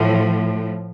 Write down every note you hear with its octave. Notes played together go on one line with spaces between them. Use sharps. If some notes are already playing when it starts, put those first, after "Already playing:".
Already playing: A2 F3